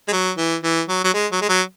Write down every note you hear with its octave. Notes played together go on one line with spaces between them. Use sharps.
G#3
F#3
E3
E3
F#3
F#3
G#3
F#3
G#3
F#3